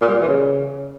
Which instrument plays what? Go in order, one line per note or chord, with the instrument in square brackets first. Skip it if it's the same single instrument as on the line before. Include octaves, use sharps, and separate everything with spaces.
[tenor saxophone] A#2
G3
A#2
E3
C#3